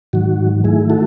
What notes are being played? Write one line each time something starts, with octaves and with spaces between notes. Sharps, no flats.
G#2 D#3 F#3 F#4
D#3 A3 E4 G#4
F#4 A4